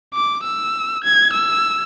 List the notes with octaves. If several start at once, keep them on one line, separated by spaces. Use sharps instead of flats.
D6
E6
G#6
E6